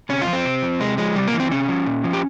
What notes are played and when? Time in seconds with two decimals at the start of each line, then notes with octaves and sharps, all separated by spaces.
0.09 C3 C#4
0.22 F4
0.27 F3
0.33 C4
0.45 C3
0.62 F3
0.80 C3 G#3
0.98 F3 G#3
1.15 C3 G3
1.27 A#3
1.33 E3
1.40 C4
1.51 C3 C#4
1.69 F3
1.87 A#2
2.04 F3
2.13 G4